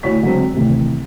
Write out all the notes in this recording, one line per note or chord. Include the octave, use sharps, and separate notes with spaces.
D2 E4 C#5 B6
D3 F#3 G#3 C4
D#2 A2 C3 E3 A3